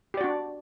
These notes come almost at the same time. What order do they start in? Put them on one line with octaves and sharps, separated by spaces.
G4 D5 F#4 D4